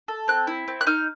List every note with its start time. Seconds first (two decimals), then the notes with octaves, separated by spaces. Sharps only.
0.08 A4
0.28 C4 F#6
0.47 E4
0.68 C4
0.81 F#6
0.87 D#4 F6